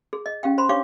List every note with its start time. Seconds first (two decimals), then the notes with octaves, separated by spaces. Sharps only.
0.13 G#4
0.26 D#5
0.43 C#4 G4 F5 G5
0.58 C5 B5 C6
0.69 D4 G4 C#5 F5 C#6 D6